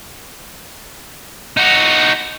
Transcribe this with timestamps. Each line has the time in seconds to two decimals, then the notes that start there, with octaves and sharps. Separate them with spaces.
1.57 D#4 F#4